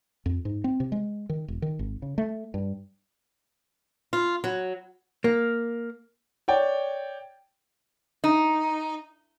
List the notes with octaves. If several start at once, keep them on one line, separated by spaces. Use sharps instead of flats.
F2
G#2
C4
C3
G#3
D#3
E1
D#3
G#1
C#3
A3
G2
F4
F#3
A#3
C#5 D5 G5
D#4